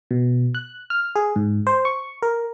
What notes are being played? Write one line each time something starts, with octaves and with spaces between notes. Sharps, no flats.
B2
F#6
F6
G#4
G#2
C5
C#6
A#4